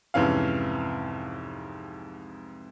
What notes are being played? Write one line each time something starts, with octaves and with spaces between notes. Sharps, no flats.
C2 F2 G#2 E3 C#4 F5